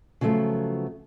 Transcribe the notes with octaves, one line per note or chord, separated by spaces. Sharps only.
C#3 F3 F#3 A3 B3